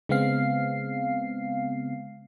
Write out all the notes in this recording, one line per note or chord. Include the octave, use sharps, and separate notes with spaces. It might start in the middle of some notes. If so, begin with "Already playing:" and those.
C#3 G#3 B3 C4 F5 C7